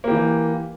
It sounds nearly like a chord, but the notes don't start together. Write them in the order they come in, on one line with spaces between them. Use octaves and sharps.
A#3 G4 E3